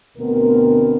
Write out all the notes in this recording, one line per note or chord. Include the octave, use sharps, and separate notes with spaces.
D2 B2 B3 C4 A#4